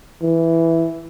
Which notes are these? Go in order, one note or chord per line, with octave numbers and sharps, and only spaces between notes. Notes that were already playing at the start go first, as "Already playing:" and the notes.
E3